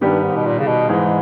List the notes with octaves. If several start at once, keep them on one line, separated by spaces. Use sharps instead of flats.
G2 D#3 G3 B3 G4
G#2
B2
A#2
C#3
B2
G#2 E3 G#3 D#4